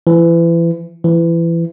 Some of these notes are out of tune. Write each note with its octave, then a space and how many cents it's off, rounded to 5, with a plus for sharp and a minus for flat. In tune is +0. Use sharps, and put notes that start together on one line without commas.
E3 +30
E3 +25